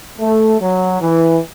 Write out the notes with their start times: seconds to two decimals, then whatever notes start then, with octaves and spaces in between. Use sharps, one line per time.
0.18 A3
0.60 F#3
1.01 E3